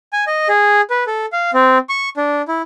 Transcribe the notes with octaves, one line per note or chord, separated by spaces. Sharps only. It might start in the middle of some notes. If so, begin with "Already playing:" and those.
G#5
D#5
G#4
B4
A4
F5
C4
C#6
D4
E4